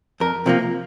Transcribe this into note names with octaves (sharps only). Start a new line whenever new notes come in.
F2 A#4
C3 F3 A#3